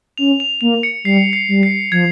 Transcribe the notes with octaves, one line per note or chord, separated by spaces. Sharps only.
C#4 F7
F7
A#3 F7
C#7
G3 C7
C7
G3
C7
F3 G#6